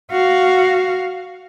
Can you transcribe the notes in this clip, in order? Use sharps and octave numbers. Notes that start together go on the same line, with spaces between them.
F#4 F5